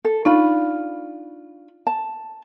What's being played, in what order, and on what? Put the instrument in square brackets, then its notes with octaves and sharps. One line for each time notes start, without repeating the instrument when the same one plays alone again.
[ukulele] A4
[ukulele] D4 F4 B5 [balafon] D#4
[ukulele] A5